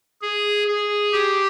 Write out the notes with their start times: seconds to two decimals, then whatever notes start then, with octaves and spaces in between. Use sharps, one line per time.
0.21 G#4
0.67 G#4
1.12 G4